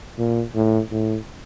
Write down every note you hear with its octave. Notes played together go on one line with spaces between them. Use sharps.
A#2
A2
A2